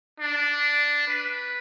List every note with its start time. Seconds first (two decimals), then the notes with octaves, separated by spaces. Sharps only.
0.20 D4
1.08 B4